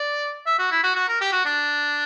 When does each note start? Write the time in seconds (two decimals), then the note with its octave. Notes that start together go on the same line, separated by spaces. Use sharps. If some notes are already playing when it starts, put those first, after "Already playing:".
Already playing: D5
0.46 E5
0.59 F#4
0.71 E4
0.83 F#4
0.96 F#4
1.08 A#4
1.21 G4
1.33 F#4
1.45 D4